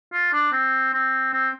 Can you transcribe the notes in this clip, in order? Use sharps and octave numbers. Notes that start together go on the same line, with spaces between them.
F4
D4
C4
C4
C4